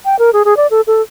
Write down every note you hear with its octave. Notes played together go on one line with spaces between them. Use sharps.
G5
A#4
G#4
G#4
D5
A4
A4